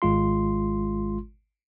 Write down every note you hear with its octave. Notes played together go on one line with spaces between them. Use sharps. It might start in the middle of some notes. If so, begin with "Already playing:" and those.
G#1 G#3 F4 C6